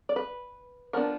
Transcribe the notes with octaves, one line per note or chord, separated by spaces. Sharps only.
D5
B4
F3 B3 D4 A#4